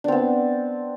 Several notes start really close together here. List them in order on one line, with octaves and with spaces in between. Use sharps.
D4 C4 B3